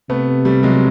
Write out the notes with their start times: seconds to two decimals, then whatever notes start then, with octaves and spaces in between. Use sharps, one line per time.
0.09 C3 A3 B3
0.45 G3 A3
0.63 F#3 G#3